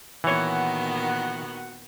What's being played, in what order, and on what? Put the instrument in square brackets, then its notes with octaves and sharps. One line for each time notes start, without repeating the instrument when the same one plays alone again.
[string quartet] A#2 D#3 B3 [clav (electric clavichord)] E3 C#5 [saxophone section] F#4 F#5